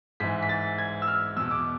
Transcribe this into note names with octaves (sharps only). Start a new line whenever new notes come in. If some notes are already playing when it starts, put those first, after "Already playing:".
G#2 E3 B6
B6
A6
G#6
E6
F6
E2 B2 E6
D6